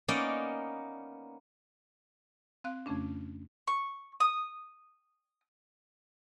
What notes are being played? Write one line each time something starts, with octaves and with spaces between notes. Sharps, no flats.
A#3 B3 C#4 D#4 D5 D#5
C4 F5 F#6
F2 C#3 A3 C#4 D4
C#6
D#6